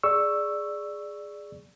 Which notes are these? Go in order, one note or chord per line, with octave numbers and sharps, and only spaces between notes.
G#4 D5 C#6 E6